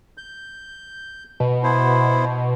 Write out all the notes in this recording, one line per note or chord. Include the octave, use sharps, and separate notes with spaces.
G6
B2
B3 E4 C5